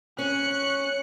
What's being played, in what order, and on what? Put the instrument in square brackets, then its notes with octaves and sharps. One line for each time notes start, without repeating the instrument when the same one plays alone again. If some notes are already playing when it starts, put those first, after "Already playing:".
[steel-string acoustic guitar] C#4 [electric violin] F#6 C#7